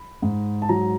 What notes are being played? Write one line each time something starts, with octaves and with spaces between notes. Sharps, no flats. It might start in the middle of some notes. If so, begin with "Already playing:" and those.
Already playing: B5
G#2
A5
F#3 A#5